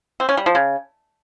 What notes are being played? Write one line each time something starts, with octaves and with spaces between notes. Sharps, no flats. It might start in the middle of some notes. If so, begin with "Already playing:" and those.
C4
C#4
G3
F3
C#3